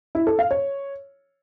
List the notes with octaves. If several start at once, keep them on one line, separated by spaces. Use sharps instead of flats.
E4
A4
F5
C#5